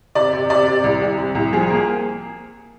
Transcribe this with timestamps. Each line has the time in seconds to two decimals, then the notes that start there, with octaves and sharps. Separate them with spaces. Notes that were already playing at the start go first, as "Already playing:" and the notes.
0.15 C3 D5
0.33 C3
0.50 C3 D5
0.67 C3
0.84 C2
1.01 C2
1.18 C3
1.35 C2
1.53 F3 G#4
1.70 A#3